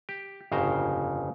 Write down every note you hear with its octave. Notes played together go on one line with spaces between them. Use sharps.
G4
G1 F2 A#2 C#3 C5 A#5